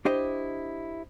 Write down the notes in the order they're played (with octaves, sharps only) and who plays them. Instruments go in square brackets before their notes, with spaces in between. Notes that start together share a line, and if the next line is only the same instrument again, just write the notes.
[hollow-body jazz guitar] D4 E4 G4 C5 D#5